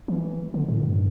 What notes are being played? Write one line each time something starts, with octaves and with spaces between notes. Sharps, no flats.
E3
D3
A2
G2